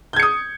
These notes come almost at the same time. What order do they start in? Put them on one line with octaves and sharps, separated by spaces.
G6 G#6 C#7 D#6